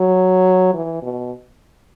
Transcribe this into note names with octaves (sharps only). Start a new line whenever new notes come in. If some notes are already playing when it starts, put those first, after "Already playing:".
Already playing: F#3
E3
B2